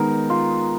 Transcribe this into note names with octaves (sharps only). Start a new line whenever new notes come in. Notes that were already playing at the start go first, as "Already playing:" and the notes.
Already playing: D#3 G#3 B3 D#4 A#4
F4